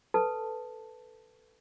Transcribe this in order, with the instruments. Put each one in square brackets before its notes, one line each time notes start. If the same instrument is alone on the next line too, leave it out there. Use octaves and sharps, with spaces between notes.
[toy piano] A4 B4 A5